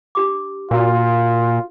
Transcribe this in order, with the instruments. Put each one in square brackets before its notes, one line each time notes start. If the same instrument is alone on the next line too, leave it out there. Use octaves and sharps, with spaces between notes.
[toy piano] D4 G4 D6
[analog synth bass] A#2 [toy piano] D4 F#4 A#4 [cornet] F4